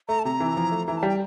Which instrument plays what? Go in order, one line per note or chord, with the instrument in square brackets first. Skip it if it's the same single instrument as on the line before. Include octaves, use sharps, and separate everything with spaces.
[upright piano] A3 [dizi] A#5
[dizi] A5
[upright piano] C3 [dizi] A#5
[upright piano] E3
F3
A3
[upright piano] E3 [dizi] A#5
[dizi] A5
[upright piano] G3
[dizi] G5